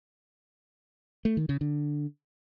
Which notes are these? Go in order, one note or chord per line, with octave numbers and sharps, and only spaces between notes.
A3
D#3
C#3
D3